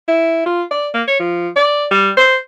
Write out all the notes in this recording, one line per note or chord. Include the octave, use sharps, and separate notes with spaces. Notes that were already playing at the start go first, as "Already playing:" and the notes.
E4
F4
D5
A#3
C#5
F3
D5
G3
C5